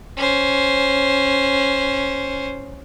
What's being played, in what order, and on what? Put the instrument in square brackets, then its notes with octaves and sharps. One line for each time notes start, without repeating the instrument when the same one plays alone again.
[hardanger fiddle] C#4 C5